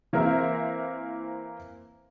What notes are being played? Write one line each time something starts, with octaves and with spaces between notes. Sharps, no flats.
E3 A#3 C4 A#4 C5 E5